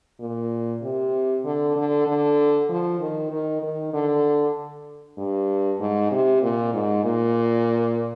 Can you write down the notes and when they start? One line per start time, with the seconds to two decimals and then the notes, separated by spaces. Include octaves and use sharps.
0.20 A#2
0.83 C3
1.45 D3
1.76 D3
2.07 D3
2.69 F3
3.00 D#3
3.31 D#3
3.62 D#3
3.93 D3
5.17 G2
5.80 G#2
6.12 C3
6.42 A#2
6.73 G#2
7.04 A#2